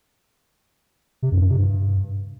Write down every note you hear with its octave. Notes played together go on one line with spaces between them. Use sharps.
C3
F#2
G2
C3
G2